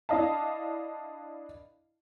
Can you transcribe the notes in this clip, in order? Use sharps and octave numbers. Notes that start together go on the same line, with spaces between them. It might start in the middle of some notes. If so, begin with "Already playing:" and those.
D4 E4 D#5 F5 A5